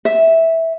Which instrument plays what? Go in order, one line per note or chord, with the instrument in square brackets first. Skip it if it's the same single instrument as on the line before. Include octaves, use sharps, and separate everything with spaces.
[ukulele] E5